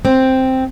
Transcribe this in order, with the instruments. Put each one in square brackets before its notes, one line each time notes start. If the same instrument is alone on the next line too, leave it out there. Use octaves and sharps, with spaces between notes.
[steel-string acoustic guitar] C4